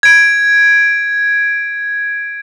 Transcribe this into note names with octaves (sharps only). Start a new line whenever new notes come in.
G#6 D7